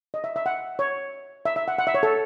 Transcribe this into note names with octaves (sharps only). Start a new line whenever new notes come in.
D#5
E5
E5
F#5
C#5
E5
E5
F#5
F#5
E5
C#5
A4